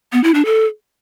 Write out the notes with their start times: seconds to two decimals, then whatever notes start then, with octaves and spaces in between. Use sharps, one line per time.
0.13 B3
0.24 E4
0.34 D4
0.45 A4